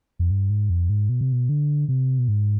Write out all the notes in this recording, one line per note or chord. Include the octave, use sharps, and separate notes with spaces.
F2
G2
G#2
F2
G#2
B2
C3
B2
D3
C3
B2
G#2